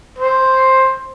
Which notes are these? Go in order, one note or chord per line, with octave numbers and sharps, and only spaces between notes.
C5